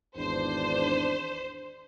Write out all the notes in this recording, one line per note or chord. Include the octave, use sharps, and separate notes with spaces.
G#1 E2 D4 C5